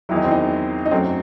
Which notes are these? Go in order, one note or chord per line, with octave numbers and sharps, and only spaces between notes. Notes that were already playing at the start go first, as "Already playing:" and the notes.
E2 D#3 F#3 E4
D#4
C4
D#4
D#4
F#2 F#3 A3 C4